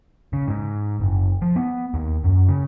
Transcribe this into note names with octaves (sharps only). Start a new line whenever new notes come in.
C#3
G#2
F#1
F3
B3
D#2
F#2
C#3